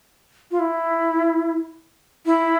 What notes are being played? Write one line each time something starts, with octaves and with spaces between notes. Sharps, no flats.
F4
E4
E4